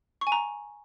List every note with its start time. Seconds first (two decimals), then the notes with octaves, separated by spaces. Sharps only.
0.21 C#6
0.27 G#5
0.32 A#5